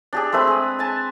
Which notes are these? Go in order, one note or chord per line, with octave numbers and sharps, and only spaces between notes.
D4 G4 G#4
G#3 A3 C4 B4
G#4
G#5 A5